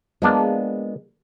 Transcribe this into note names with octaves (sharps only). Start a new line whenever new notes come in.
F3 G#3 A#3 B3 D4